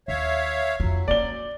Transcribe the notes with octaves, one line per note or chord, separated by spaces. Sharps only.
D#2 C#5 E5 F5
F2 F#3 F4
A#3 C#4 D5 G7